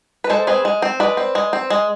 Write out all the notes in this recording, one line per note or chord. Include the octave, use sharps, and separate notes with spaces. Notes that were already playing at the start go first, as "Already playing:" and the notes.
B4
G#3 A4 C5
C4 G#4 B4
G#3
C4
G#3 B4 D5
C4
G#3
C4
G#3